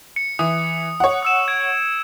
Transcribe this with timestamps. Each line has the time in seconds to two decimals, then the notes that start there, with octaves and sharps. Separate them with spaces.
0.16 C#7
0.39 E3 D#6
1.00 C#5 F#5
1.23 D#6 E6 E7
1.48 G#6 D7